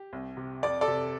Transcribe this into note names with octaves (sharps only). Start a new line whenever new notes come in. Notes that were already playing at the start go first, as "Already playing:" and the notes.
Already playing: G4
C2
C3
F2 D5
A4 D5
C3